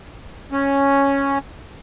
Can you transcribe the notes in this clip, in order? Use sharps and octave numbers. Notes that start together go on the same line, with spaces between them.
C#4